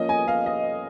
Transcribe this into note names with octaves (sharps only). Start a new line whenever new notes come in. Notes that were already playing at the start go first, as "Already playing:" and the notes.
Already playing: F3 A#3 C#4 D#5
G#5
F5
D#5